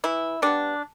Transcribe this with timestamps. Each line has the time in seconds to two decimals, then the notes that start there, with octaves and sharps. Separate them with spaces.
0.04 E3 E4
0.42 G3 B3 D4